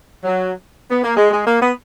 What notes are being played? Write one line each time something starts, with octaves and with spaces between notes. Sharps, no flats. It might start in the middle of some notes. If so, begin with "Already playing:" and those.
F#3
B3
A#3
G#3
G#3
A#3
B3